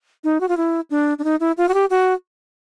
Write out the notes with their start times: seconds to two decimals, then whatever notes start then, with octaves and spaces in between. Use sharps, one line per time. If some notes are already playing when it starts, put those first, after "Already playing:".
0.24 D#4
0.41 F#4
0.49 F4
0.57 E4
0.90 D4
1.19 D4
1.24 D#4
1.40 E4
1.58 F4
1.69 F#4
1.74 G4
1.90 F#4